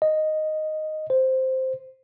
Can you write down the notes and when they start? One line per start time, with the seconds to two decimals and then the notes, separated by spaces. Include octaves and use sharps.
0.02 D#5
1.10 C5